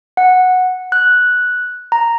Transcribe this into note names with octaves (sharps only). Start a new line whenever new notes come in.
F#5
F#6
A#5